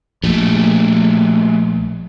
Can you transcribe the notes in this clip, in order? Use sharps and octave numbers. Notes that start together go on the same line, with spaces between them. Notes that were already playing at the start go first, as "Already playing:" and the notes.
A#1 G3 A3